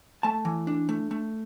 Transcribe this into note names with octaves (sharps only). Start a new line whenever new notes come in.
A3 A5
E3
D4
A3
A3